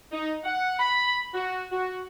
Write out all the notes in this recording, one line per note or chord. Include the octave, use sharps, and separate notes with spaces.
D#4
F#5
B5
F#4
F#4